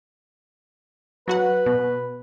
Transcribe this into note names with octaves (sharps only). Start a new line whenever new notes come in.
F#3 F#4 B4 F#5
B2